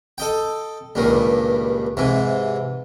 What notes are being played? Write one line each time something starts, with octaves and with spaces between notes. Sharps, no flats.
A4 D#5 G5
C#2 G2 A#2 D#3
G#2 C3 E3